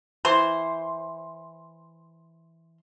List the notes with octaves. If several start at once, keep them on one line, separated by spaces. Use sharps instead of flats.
E3 C5